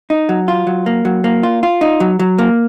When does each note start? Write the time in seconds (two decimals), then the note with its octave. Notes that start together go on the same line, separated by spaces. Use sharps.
0.10 D#4
0.29 F#3
0.48 F4
0.67 F#3
0.86 A#3
1.05 F#3
1.24 A#3
1.43 F4
1.63 F4
1.81 D#4
2.00 F#3
2.19 F#3
2.38 A#3